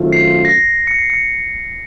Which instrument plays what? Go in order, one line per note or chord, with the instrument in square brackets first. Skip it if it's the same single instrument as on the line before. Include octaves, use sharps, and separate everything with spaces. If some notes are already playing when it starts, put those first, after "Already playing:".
Already playing: [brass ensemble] F#2 D#3 A3 C4 F4
[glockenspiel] C7
A#6
C#7
C7
C#7